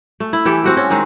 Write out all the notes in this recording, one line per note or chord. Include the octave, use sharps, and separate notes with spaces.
A3
E4
E3 G4 A4
C4 F#4 G4
C#4
D#3 G#3 C4 D#4